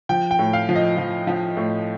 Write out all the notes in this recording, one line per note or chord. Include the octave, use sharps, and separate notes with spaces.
F3 G5
G5
A2
F5
F3
D#5
F3
F3
A2